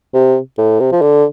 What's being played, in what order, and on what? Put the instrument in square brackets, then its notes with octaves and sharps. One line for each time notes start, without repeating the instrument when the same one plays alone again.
[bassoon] C3
A2
C3
F3
D3